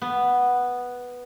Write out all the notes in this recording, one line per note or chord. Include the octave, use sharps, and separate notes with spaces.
B3